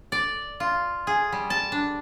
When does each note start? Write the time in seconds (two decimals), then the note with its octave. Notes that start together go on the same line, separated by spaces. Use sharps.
0.12 D5
0.60 F4
1.07 G#4
1.32 G3
1.50 A5
1.72 D4